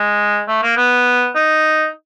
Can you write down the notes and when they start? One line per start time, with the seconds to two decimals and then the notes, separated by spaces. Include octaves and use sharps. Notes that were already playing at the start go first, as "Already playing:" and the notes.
Already playing: G#3
0.48 A3
0.63 A#3
0.77 B3
1.35 D#4